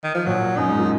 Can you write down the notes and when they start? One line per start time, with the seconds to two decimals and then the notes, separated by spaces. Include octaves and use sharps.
0.04 D#3
0.15 F3
0.26 A#1 A#2 F#3
0.57 F#2 D#4
0.68 G#2
0.79 A#2